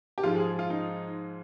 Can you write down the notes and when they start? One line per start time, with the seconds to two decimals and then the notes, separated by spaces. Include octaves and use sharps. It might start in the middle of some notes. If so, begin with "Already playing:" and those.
0.18 G4
0.23 G#2 F3 G#3 F4
0.35 G#4
0.59 F4
0.70 D#4